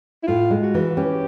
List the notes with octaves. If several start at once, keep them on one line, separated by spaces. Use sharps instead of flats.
E4
A2 F4
G#3
F#4
E3
C#4 G4